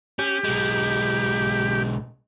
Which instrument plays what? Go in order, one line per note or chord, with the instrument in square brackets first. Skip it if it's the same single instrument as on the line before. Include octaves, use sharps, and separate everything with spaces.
[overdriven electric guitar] C#4 [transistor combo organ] G4
[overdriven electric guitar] B1 G#3